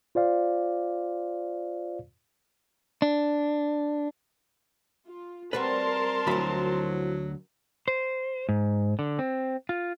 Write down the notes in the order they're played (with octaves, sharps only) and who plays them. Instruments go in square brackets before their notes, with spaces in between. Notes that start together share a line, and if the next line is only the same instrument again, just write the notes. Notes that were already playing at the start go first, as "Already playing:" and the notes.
[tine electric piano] F4 C5 D5 F5
[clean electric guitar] D4
[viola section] F4
[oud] G3 C4 F#4 [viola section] A#4 A5 C6 [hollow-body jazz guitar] B4
[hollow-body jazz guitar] D2 B5 [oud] F3 E4 [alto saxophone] F#3
[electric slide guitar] C5
G#2
D3
C4
F4